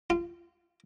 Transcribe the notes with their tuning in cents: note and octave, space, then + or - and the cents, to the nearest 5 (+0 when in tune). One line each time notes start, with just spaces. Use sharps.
F4 -25